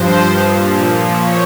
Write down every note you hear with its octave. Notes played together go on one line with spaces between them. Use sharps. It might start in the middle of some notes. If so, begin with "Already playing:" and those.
Already playing: G2 F3 C5
A#2 F3
C#5